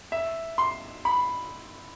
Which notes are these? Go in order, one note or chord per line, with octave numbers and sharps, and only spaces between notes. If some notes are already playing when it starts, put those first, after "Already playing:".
E5
C6
B5